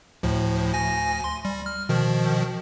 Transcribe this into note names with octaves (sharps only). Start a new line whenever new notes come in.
D2 A2 F3
D2 G#5 A#6
C6
G3
F6
B2 D#3 F3